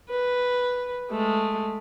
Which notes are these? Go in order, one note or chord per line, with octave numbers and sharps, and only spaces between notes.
B4
G#3 A3